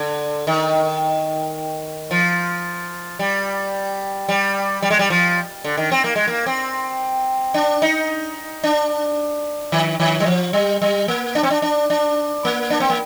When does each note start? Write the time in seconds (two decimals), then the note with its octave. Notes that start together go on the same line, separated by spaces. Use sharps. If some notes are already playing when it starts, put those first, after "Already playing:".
Already playing: D3
0.47 D#3
2.11 F3
3.19 G3
4.29 G3
4.82 G3
4.90 G#3
4.99 G3
5.10 F3
5.64 D3
5.77 D#3
5.92 C4
6.04 A#3
6.16 G#3
6.28 A#3
6.46 C4
7.54 D4
7.82 D#4
8.64 D4
9.72 D#3
10.00 D#3
10.20 G3
10.26 F3
10.53 G3
10.82 G3
11.08 A#3
11.35 D4
11.43 C4
11.50 D4
11.62 D4
11.90 D4
12.45 A#3
12.70 D4
12.80 C4
12.90 A#3